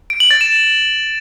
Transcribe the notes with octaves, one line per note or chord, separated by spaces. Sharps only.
D7
F#7
A6
E7